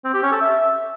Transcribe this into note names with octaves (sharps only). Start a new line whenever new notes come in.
C4
G4
C#4
A4
E5